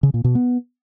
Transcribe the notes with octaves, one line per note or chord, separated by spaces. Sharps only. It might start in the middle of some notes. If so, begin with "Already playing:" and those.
C#3
A#2
B2
B3